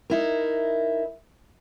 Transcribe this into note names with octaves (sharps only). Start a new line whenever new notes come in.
D#4 E4 A#4